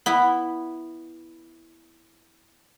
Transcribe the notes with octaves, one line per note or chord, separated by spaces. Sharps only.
B3 E4